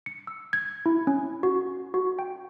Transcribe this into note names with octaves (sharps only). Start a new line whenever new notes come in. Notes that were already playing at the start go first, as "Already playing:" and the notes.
C#7
E6
G#6
E4
C#4
F#4
F#4
G5